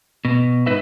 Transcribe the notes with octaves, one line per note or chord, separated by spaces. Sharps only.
B2
G#2 D#4 B4 E5